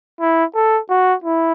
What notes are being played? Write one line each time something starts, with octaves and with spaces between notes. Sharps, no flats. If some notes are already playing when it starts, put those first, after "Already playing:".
E4
A4
F#4
E4